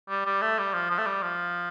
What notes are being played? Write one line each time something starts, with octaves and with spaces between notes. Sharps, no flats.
G3
G3
A3
G3
F3
F3
A3
G3
F3